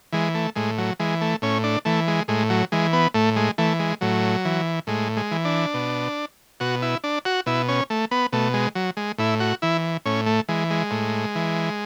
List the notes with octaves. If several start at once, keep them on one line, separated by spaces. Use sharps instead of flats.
E3 G#3
A3
A2 G#3
F#3
E3 G#3
A3
A2 C#4
D4
E3 A3
G#3
A2 G#3
F#3
E3 G#3
B3
A2 A3
G#3
E3 A3
G#3
A2 F#3
E3
A2 G#3
G#3
E3
D4
B2
B2 F#4
E4
D4
F#4
B2 E4
C#4
A3
B3
B2 A3
G#3
F#3
G#3
A2 E4
F#4
E3 E4
A2 C#4
A3
E3 G#3
G#3
A2
E3